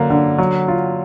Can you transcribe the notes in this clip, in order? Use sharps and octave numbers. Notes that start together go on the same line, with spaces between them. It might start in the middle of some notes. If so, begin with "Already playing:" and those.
Already playing: D3 F#3 A#3
D3
F#3
F4